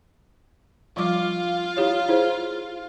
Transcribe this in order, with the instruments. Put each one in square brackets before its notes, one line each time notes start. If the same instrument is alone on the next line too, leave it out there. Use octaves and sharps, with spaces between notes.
[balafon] F3 G3 D6 [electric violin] F4 F5
[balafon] E4 G4 C#5
E4 G#4 C5